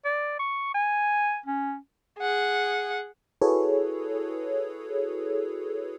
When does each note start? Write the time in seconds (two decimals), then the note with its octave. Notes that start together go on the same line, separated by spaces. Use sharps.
0.05 D5
0.39 C#6
0.74 G#5
1.46 C#4
2.19 G#4 F#5
3.41 E4 F#4 G#4 A4 B4 C#5